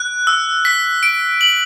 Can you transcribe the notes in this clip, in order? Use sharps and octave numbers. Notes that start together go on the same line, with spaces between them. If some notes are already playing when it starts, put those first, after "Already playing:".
Already playing: F#6
E6
B6
D7
F#7